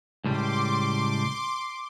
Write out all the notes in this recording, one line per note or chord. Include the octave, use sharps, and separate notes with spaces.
C#2 A2 G3 C6 D6